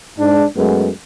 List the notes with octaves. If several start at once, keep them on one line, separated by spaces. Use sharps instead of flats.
G#2 D4
F#2 G#3 A3 B3